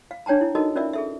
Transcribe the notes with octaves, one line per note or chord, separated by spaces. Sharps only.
F5
D4 C#5 G5 A5 A#5
E4
D#4 F#4 A4 A#4 D#5 A5
C#4 F4 A#4 D5 E5
G#4 A4 E5